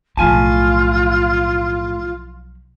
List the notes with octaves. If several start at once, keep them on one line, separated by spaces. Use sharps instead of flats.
B1 A2 F3 F4 G#5 A5